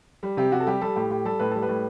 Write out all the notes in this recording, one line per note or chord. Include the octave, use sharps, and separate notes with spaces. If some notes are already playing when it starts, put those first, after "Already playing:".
G3
C3 G4
C3 F#4
A4
G3 G4
G3 A4
A2 G4
A2 G4
G3 A4
A2 B4
G3 A4
B4
A2